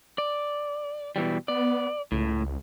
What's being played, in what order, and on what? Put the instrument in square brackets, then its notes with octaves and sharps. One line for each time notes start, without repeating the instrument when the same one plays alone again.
[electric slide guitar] D5
B2 E3 G3
[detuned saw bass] B3 [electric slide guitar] D5
[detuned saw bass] C#2 [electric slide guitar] A2